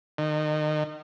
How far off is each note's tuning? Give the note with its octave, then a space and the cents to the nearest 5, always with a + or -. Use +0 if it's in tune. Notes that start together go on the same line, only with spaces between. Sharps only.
D#3 -30